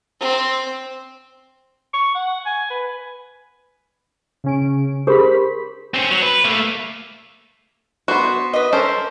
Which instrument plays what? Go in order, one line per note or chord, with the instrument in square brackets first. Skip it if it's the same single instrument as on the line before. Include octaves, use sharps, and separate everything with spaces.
[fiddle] C4
[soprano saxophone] C#6
F#5
G#5
B4
[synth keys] C#3 C#4 D7
[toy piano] G4 G#4 A#4 [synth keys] C5 B5 B6
[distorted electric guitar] C4 C#4
F#3
B4
A3 A#3
[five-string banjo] B3 F#4 [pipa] C5
[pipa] B4 D#5
[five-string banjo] C#4 A4 A#4 [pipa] C5